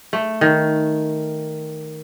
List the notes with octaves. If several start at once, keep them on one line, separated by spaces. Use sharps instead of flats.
A3
D#3